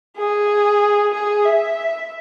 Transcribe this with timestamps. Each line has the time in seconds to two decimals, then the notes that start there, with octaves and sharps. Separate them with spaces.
0.17 G#4
1.14 G#4
1.45 E5